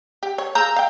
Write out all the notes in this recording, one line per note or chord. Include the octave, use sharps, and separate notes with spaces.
G4
C#5
A#3 G#4 A#5 E6 G6
F5 G5